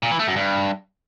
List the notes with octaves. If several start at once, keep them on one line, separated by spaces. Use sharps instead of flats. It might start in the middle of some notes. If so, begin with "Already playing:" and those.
A#2
E3
A3
F#2
G2